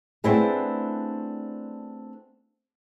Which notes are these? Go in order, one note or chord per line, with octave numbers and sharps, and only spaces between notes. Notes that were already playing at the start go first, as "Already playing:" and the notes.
A3 B3 C4 D4 E4 G#4